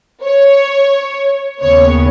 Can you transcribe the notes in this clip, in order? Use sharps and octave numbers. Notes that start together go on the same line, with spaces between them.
C#5
D#2 C#3 B3 C#5